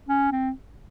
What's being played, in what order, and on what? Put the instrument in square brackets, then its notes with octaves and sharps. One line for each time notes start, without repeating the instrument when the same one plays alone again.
[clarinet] C#4
C4